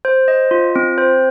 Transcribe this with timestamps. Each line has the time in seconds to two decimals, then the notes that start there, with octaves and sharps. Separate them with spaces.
0.05 C5
0.28 D#5
0.51 F4
0.76 C4
0.98 C5